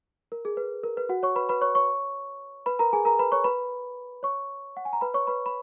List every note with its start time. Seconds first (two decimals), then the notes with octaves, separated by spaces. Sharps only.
0.32 A#4
0.45 G#4
0.57 B4
0.84 A#4
0.97 B4
1.09 F#4 F#5
1.23 C#5 C#6
1.36 B4 B5
1.49 B4 B5
1.62 C#5 C#6
1.75 C#5 C#6
2.66 B4 B5
2.79 A#4 A#5
2.93 G#4 G#5
3.05 A#4 A#5
3.19 B4 B5
3.32 C#5 C#6
3.44 B4 B5
4.23 C#5 C#6
4.77 F#5
4.85 G#5
4.93 A#5
5.01 B4 B5
5.14 C#5 C#6
5.27 B4 B5
5.46 B5